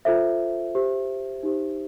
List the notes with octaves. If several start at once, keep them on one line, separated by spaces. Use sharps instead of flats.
F4 A4 C5 E5
G4 C5
D#4 G4 C5